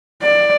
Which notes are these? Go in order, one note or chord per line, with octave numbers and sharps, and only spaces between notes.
D5